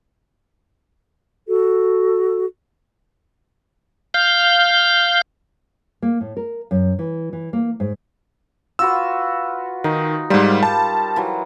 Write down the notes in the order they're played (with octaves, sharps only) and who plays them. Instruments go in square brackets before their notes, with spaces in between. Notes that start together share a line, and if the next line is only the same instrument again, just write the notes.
[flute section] F#4 A4
[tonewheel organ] F5 G6
[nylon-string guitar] A#3
A2
A#4
F#2
E3
E3
A#3
G#2
[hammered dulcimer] F4 F#4 B4 [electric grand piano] E6
[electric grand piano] D#3 [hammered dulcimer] D#4
[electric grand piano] G#2 G3 [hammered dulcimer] A#4 C5 F5
[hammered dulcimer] G3 [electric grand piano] A5
[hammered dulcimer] E3 F#3